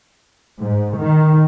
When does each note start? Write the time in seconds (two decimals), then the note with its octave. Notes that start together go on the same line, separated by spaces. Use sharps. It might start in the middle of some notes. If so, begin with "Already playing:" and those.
0.60 G#2
0.98 D#3